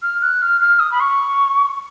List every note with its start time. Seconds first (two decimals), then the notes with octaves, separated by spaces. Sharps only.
0.02 F6
0.22 F#6
0.42 F6
0.61 F6
0.80 D#6
0.92 B5
1.00 C#6